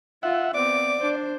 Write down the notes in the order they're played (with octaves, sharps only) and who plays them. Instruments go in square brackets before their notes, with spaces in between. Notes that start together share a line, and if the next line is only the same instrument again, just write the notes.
[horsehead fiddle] F4 [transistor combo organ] E5 F#5
[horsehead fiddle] B3 C4 [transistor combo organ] D5 [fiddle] D6
[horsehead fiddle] D4 C5